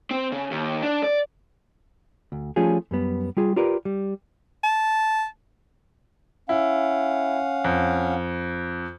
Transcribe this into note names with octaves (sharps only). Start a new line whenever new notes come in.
C4
C#3
D#2
D4
D5
D2
F3 G3 A3 C#4 F4 G#4
F#2 G3 B3
G3 F4 G#4
F4 G4 A#4 B4 D5
G3
A5
C#4 E4 F5 F#5
F2